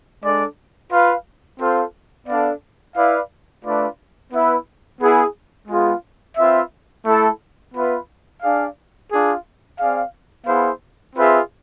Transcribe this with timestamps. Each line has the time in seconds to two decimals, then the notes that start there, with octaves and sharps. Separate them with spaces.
0.22 G#3 D4 A4 D5
0.90 F4 B4 F5
1.58 C4 F4 A4 C5 F5
2.27 B3 D4 A4 D5 F5
2.95 E4 B4 D5 F5
3.64 A3 D4 F4 B4 D5
4.32 B3 E4 B4 E5
5.01 B3 E4 G#4
5.68 G#3 B3 F4 G#4
6.36 C4 F4 B4 E5
7.06 A3 E4 A4
7.74 B3 F4 B4 E5
8.42 D4 G#4 D5 F5
9.11 D4 F4 G#4
9.79 C4 G#4 D5 F5
10.47 B3 E4 G#4 C5 F5
11.16 C4 F4 G#4 B4 E5